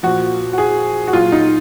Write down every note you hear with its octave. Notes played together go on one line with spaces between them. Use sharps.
A#2 F3 F#4
F#4
G#4
F#4
A#2 F#3 F4
D#4